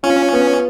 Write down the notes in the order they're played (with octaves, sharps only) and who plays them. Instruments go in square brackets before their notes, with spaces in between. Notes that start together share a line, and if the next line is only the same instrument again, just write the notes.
[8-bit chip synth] C#4 [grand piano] F4
[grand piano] B3